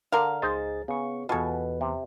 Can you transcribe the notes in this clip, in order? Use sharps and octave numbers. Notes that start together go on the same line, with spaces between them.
D3 A#4 F5
C#2 D#4 G#4 C5 D#5 A6
C#3 B3 C#6
E2 B2 F4 A4 B4 G#5
C3